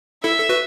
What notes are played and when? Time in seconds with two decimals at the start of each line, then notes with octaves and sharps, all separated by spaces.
0.24 E4 A4 E5
0.39 A4
0.49 F#4 B4